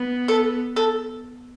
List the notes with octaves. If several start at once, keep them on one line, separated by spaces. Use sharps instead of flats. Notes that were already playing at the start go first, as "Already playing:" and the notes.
Already playing: B3
A4
A4